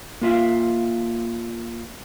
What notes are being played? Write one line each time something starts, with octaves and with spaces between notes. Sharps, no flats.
A#3 F4 E5 F5